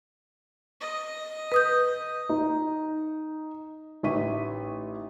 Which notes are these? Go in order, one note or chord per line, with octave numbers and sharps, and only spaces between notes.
D#5
B4 D#6 G6
D#4
A1 D#4 E5 C#6 B6 D#7